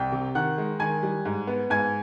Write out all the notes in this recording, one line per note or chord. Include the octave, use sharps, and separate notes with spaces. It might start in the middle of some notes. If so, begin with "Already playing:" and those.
Already playing: C2 G5 G6
C3
D#3 F#5 F#6
G#3
D#3 G#5 G#6
G3
G#2
B3
G#2 G#5 G#6